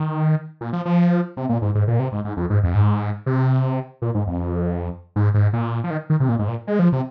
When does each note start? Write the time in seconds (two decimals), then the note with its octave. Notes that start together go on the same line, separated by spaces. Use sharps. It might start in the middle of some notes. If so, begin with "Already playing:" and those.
Already playing: D#3
0.61 A#2
0.73 F3
0.85 F3
1.37 C3
1.49 A#2
1.62 G#2
1.75 G#2
1.88 A#2
1.99 C3
2.12 G#2
2.25 G#2
2.37 F2
2.50 G#2
2.63 F2
2.75 G#2
3.26 C3
4.02 A#2
4.15 G#2
4.27 F2
5.16 G#2
5.34 G#2
5.53 A#2
5.84 F3
5.90 D#3
6.10 D#3
6.20 C3
6.29 A#2
6.39 G#2
6.48 A#2
6.67 G#3
6.79 F3
6.92 C3